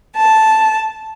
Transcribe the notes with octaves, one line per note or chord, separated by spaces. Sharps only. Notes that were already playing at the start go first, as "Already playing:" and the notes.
A5